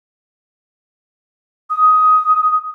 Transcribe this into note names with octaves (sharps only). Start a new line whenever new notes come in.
D#6